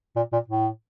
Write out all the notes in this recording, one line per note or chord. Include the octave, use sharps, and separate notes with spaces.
A#2
A#2
A2